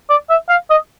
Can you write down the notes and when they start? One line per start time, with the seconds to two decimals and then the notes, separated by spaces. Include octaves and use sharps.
0.09 D5
0.29 E5
0.49 F5
0.70 D#5